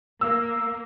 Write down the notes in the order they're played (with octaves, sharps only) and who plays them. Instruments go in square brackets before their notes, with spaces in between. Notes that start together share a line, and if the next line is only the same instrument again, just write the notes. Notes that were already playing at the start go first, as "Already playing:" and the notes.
[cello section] A#3 [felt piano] E6